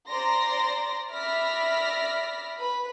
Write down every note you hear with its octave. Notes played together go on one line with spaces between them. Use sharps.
C5 D5 A#5 C6 A#6
D5 E5 B5 F6 A#6 B6
B4 B5